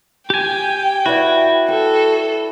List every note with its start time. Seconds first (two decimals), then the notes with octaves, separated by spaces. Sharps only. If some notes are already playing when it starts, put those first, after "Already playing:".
0.30 G4 G5 G#5
1.06 E4 F#4 B4 D5
1.68 A4 G5